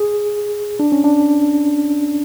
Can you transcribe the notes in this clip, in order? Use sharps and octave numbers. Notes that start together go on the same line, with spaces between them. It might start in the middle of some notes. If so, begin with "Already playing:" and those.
Already playing: G#4
D4
C#4
D4